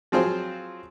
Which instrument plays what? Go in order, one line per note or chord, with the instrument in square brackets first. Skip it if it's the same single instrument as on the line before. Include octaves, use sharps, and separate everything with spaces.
[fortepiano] F3 F#3 C4 F4 G#4 C5